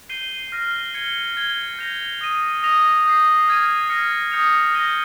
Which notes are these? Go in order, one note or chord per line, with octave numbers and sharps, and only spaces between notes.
G6 C7 D#7 G7
F6 A#6 D#7
G#6 C#7 G7
G#6 C7 G7
G6 A#6 F7
D#6 A#6 D#7
D#6 A#6 F7
D#6 G6 C7
F6 G#6 D#7
F6 A#6 C#7
D#6 G6 C#7 F7
G6 A#6 D#7 G7